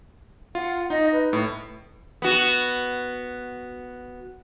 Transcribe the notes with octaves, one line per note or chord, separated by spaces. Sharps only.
F4 F#5
D#4 D#5
B4
A2
B3 F#4